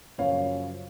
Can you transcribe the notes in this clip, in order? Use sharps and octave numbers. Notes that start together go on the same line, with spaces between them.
F#2 C#3 F3 C#5 F5